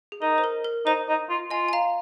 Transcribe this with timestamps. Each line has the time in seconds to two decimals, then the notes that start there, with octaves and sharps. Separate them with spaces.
0.12 G#4
0.22 D#4 A#4
0.38 C5
0.44 A#4
0.65 A#4
0.86 D#4 C5
1.08 D#4
1.30 F4
1.51 F4 D#5 G#5
1.69 G#5
1.73 F5 A#5